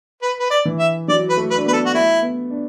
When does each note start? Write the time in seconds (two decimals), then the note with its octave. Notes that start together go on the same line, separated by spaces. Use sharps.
0.22 B4
0.39 B4
0.50 D5
0.65 E3
0.79 E5
1.08 F#3 D5
1.29 B4
1.37 A3
1.50 B4
1.56 D4
1.66 B3 B4
1.73 A4
1.85 F#4
1.93 A3 E4
2.22 B3
2.50 D4